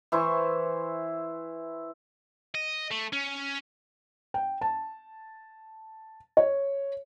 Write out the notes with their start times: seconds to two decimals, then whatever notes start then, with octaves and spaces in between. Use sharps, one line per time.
0.12 E3 E4 C5 C#6
2.55 D#5
2.91 A3
3.13 C#4
4.34 G5
4.61 A5
6.37 C#5